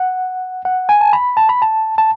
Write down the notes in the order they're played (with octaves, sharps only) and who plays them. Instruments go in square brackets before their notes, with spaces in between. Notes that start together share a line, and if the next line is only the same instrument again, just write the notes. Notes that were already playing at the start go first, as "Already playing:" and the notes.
Already playing: [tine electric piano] F#5
F#5
G#5
A5
B5
A5
B5
A5
A5